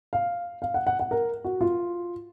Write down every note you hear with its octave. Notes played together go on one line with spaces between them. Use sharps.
F5
F5
F#5
F#5
F#5
A#4
F#4
F4